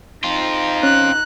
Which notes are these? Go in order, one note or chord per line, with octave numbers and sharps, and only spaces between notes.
C4 D#4 F4
C#4 F#6